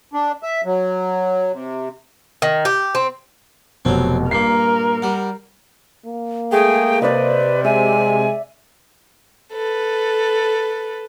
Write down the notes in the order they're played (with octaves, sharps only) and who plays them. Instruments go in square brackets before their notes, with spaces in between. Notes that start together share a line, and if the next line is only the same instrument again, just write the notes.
[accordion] D4
E5
F#3
C3
[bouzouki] D#3
G4
C4
[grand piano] F1 B2 [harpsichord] F#3 C4
[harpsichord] G2 A#2 [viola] A#4 [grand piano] C7
[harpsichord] G3 F#5
[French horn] A#3
[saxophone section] G#3 A3 G#4 [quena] G5
[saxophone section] C3 [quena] B4 [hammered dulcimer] D5 D#5
[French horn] G#3 [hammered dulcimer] E5 [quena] G#5
[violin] A4 B4